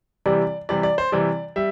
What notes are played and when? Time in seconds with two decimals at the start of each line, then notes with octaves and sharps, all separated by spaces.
0.26 C3 E3 G3 D5
0.69 C3 E3 G3 D5
0.83 D5
0.98 C5
1.12 C3 E3 G3 D5
1.56 G3 E5